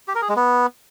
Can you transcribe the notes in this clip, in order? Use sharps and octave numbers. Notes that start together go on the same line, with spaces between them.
G4
A#4
G#4
G#3
B3